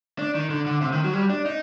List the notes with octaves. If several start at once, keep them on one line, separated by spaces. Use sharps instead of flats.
D4
D#3
D3
D3
C3
D#3
F#3
G3
D4
D#4